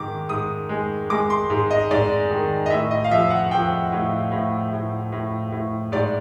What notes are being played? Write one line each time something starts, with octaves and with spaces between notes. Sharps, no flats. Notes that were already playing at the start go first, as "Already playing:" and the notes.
Already playing: G#2 D#3 D6
G#2 D#6
G#3
G#3 D6
C6
G#2
D#5
G#2 D5
D#3
D#5
A2 E5
D#5
F5
F3 E5
F#5
F3 G5
A2
A2
A2
A2
A2
G#2 D5